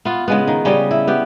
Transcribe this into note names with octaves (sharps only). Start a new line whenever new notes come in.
B3 F4
C#3 G#3 B3
D#3
C#3 G3 C#5 D#5
E4
B3 G4